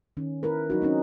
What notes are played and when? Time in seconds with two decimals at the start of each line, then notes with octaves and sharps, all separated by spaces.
0.17 D#3 C#4
0.43 E4 A#4 B4
0.70 F#3 D#4 F#4
0.82 C4 C#4 D#4